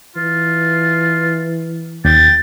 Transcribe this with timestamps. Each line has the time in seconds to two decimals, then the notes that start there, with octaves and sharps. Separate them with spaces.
0.16 E3 F4
2.05 D#2 G5 A6